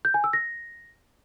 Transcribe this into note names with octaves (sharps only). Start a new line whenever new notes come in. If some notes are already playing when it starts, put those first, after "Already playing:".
G6
G#5
E6
A#6